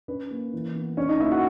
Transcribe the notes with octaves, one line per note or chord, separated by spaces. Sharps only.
C#4 B4
A#3
E3
B3
C#4 C#5
D#4 D#5
A#3 E4 E5
F#4 F#5